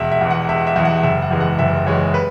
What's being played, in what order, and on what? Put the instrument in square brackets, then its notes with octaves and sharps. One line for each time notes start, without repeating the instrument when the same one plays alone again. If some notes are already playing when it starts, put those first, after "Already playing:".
Already playing: [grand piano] E1 E5
E5
E2 E3
F#5
E1 E5
E5
E2 E3
F#5
F#1 E5
F#5
E2 E3 G#3
F#5
F#1 E5
E2 E3 G#3 C#5
B4